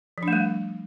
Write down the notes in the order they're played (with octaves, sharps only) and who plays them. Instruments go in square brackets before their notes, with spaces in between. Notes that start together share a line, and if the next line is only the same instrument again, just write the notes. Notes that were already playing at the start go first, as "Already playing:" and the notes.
[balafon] F3
D4
A3
G3